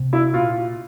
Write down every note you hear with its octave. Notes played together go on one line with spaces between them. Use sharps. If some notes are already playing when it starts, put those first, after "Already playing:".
Already playing: C3
E4
A#2 F4